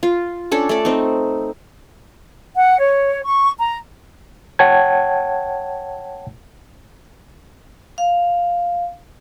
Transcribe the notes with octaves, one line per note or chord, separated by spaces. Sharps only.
F4
C#4 D4 A4
A3 D4 D5
C4 D#4
F#5
C#5
C#6
A#5
C#5 F#5 G5 A5 G#6
F5